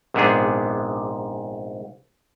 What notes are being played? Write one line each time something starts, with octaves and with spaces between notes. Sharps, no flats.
A#1 G#2 C3 B3 D4 G#4